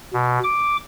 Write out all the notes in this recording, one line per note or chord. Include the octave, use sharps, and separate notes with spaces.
B2
D6